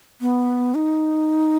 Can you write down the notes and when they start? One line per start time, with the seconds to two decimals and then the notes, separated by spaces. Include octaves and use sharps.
0.21 B3
0.75 D#4